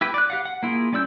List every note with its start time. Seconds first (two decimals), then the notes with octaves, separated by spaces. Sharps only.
0.01 E4 G4 B4
0.14 D5 F#6
0.30 G4 F5 F#5
0.45 F#5
0.63 A#3 E4 F4 G#4
0.92 G3 C#4 D5 E6 G6